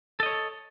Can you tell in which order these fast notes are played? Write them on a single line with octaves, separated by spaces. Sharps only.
A4 D#5 C#5